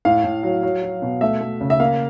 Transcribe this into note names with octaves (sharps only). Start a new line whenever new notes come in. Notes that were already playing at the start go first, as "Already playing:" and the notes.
A2 F5
A2
F#3
F#3
F#3
B2
A3 E5
A3
C#3
E5
A#3 F5